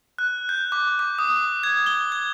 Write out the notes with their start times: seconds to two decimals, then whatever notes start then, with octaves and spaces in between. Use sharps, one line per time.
0.18 F#6
0.49 G6
0.72 D6
0.99 D6
1.19 D#6
1.63 G#6
1.86 G7
2.12 G#6